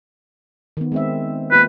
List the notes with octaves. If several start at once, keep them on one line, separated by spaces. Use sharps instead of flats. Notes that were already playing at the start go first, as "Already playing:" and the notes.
D#3 B3
G#3 C4 E5
A#3 F4 B4